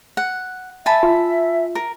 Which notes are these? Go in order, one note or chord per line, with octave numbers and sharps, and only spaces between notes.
F#5
E5 G#5 A5 B5
F4
A#4